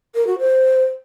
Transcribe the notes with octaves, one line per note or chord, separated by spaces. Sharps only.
A#4
F#4
C5